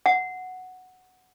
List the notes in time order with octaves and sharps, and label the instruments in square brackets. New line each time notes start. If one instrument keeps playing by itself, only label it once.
[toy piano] F#5